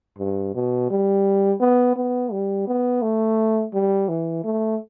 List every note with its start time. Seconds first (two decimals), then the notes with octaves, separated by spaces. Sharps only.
0.19 G2
0.55 B2
0.91 G3
1.61 B3
1.96 B3
2.32 G3
2.68 B3
3.02 A3
3.74 G3
4.09 E3
4.44 A3